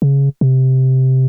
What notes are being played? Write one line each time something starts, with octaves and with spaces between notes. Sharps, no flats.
C#3
C3